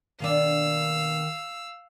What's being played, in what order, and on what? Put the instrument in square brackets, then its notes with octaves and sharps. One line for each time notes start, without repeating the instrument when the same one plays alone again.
[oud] B2 A#3 D4 [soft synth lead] D#3 [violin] F5 E6